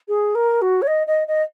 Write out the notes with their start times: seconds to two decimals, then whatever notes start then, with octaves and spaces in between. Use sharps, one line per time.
0.08 G#4
0.35 A#4
0.61 F#4
0.81 C#5
0.87 D#5
1.07 D#5
1.27 D#5